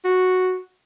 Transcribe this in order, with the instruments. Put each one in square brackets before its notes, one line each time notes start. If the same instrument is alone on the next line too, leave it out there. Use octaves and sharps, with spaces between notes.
[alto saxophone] F#4